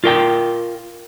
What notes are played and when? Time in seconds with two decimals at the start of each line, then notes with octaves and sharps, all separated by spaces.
0.04 F4 A#4 G5